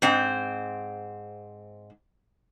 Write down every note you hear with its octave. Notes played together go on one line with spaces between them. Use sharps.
G#2 C4